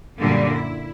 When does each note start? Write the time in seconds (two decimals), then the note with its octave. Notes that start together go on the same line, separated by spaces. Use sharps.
0.20 F#2 A#2 D3 G3
0.53 E4